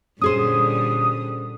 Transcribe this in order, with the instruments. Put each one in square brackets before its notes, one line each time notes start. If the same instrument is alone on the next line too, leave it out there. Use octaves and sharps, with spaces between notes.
[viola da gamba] A#2 D3 G3 [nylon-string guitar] C#4 G#4 C5 [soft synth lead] D#6